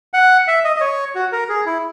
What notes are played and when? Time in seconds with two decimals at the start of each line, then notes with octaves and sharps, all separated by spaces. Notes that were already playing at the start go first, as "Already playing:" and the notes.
0.14 F#5
0.48 E5
0.65 D#5
0.76 D#5
0.81 C#5
1.15 F#4
1.32 A#4
1.49 G#4
1.66 E4